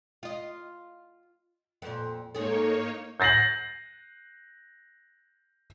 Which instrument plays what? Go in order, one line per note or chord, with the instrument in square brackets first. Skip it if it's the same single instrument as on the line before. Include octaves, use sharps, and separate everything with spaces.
[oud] F4 D#5
F2 A#2
[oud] G#2 G#4 A4 [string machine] A#3 D#4 C#5
[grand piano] G6 A6 A#6 C7 F#7